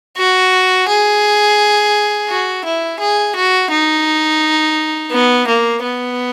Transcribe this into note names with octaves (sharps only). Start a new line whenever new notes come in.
F#4
G#4
F#4
E4
G#4
F#4
D#4
B3
A#3
B3